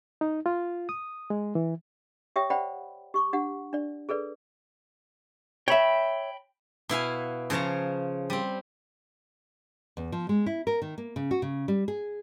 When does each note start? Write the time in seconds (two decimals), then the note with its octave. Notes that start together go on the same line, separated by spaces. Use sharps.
0.21 D#4
0.46 F4
0.89 D#6
1.30 G#3
1.55 E3
2.36 G4 C#5 E5 G5 D#6
2.50 C5 D5 F#5 G5 B5
3.14 G4 C#6 D6
3.33 D4 G4 F#5
3.73 D4 D5
4.09 G#4 A4 B4 D5
5.68 C#5 E5 G5 B5
6.89 B2 E4 F5 G#5
7.50 C#3 F3 C#5 A5 A#5
8.30 G3 C4
9.97 E2
10.12 F3
10.29 G#3
10.46 E4
10.67 A#4
10.82 D#3
10.98 A#3
11.16 C#3
11.31 F#4
11.42 C#3
11.68 G3
11.88 G#4